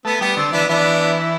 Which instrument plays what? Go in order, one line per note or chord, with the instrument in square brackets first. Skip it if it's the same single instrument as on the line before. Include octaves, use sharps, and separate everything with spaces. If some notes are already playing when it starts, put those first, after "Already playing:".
[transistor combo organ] A3 [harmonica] B3
[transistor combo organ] G3 [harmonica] B3
[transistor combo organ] D3 [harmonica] C4
[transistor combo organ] E3 [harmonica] B3 D4
[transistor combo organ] E3 [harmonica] B3 D4